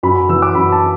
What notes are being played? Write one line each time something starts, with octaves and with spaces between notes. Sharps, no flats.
F#2 B5
B5
E3 E6
D6
F#2 B5
A5